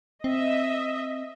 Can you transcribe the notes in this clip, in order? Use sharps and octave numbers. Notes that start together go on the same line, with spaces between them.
C4 D#5 E5